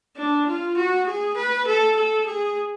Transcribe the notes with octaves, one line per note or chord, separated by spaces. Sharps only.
D4
F4
F#4
G#4
B4
A4
A4
G#4